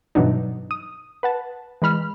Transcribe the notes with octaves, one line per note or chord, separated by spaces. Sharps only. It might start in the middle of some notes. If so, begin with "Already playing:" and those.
G2 B2 E3 F#3 D4 D#4
D#6
B4 F#5 A5
E3 G#3 B5 F6